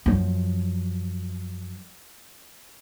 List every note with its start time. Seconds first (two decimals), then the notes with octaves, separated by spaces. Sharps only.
0.06 F#2 F3